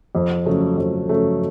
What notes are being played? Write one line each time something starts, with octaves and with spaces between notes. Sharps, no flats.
F2
C#3 F#3 A3
F2
C#3 F#3 A3